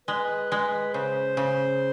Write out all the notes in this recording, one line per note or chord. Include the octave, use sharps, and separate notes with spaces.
G#3 B4
G#3
C#3 C5
C#3